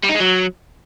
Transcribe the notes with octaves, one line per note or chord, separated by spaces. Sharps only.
G3
D#4
G#3
F#3